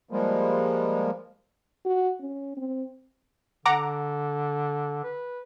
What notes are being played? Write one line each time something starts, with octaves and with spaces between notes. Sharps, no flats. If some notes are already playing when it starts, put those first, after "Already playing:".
F3 G3 G#3 A#3
F#4
C#4
C4
D3 F#5 A#5 D6
B4